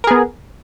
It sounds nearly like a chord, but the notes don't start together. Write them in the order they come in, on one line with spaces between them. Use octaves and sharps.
A#4 G#4 B3